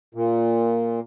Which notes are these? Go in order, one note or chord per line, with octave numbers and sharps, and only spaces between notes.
A#2